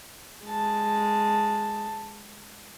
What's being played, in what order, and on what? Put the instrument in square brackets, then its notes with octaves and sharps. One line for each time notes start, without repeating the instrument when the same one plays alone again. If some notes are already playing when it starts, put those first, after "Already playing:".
[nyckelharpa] G#3 A5